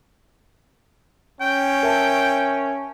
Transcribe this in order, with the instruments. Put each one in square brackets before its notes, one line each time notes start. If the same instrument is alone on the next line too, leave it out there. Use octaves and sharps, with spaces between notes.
[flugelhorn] C#4 [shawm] G5
[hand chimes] A#4 E5 A5